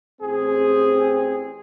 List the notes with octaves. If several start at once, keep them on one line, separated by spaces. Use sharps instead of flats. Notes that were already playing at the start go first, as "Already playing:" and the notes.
A1 C4 G#4